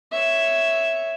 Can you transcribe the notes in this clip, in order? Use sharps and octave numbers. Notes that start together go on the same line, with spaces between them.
C#5 E5